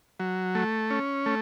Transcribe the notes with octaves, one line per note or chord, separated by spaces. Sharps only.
F#3
A3
C#4
A3